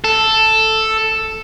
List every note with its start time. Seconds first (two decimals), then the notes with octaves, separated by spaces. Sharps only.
0.04 A4